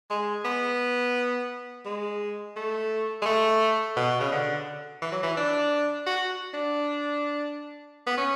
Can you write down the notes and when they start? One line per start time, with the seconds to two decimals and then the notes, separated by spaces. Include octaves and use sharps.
0.10 G#3
0.44 B3
1.85 G#3
2.56 A3
3.22 G#3
3.26 A3
3.96 B2
4.20 C#3
4.32 D3
5.01 E3
5.12 F#3
5.23 E3
5.37 D4
6.06 F#4
6.53 D4
8.06 B3
8.17 C#4